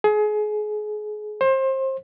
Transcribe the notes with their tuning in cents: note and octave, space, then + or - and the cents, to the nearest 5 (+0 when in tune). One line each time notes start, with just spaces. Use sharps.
G#4 +30
C5 +30